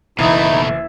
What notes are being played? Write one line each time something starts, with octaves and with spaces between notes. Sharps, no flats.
F#1 B2 E3 A3 D#4 E4 D#6